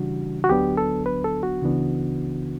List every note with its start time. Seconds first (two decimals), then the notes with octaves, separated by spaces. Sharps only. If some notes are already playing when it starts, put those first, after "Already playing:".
Already playing: C#3 E3 G3 D4 F#4
0.44 F#4
0.49 D2 D3 F#3 B3 D4 G4
0.77 A4
1.06 B4
1.24 A4
1.43 F#4
1.62 C#2 C#3 E3 B3 D4